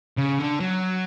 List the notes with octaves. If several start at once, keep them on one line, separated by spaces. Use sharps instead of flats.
C#3
D3
F#3